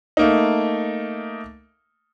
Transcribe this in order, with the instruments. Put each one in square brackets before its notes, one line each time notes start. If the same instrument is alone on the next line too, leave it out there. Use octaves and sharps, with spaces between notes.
[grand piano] A3 A#3 D#4